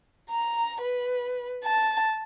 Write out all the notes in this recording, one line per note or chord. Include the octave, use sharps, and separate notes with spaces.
A#5
B4
A5